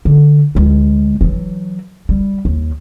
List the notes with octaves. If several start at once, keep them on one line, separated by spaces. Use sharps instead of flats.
D3
D2 G#3
E3 F#3
G3
D#2